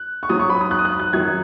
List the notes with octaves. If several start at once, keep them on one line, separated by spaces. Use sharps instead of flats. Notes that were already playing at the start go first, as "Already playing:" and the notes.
Already playing: F#6
C#6
G#2 F#3 D#6
C#6
B5
D#6
F#6
D#6
F#6
F#6
F#2 D#3 F#3 G#6